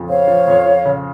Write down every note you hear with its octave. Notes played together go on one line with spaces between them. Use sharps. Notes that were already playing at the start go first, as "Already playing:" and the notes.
Already playing: F2 C#3
C4 C#5 F5
F3
F2
F4
C#3